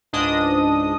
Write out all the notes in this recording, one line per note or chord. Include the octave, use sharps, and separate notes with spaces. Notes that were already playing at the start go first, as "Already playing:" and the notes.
C#2 G#2 D4 D#5 D#6